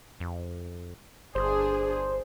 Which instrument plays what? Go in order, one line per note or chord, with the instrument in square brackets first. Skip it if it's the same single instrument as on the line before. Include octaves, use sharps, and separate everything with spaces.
[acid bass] F2
[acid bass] G1 [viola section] D4 G#4 [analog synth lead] C5